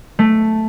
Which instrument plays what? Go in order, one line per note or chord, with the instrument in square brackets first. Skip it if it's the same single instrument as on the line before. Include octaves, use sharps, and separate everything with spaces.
[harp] A3